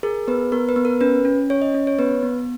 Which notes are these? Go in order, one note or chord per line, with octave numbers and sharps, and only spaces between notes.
G#4 A#4
B3 B4
B3 A#4
B4
B3
A#4
C#4 B4
C#4
C#4 C#5
D#5
C#4
C#5
B3 B4
B3